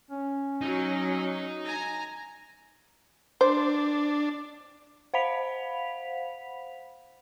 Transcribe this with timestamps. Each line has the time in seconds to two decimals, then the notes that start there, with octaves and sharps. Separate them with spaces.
0.11 C#4
0.61 F#3 D#4
1.66 G#5 A#5
3.41 D4 C5
5.14 C5 F5 F#5 B5 B6 F7